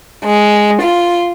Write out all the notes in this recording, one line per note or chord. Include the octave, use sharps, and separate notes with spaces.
G#3
F4